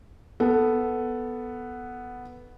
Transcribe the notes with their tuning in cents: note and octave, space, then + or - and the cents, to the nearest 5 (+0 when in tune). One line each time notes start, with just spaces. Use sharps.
B3 +0 A4 +0